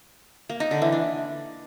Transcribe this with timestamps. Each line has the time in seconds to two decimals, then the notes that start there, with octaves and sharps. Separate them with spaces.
0.50 A#3
0.60 D#4
0.71 D3
0.82 E3
0.92 D4